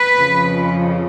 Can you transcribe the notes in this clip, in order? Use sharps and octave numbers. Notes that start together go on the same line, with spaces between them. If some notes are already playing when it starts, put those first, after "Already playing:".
Already playing: B4
F2 C#3 F3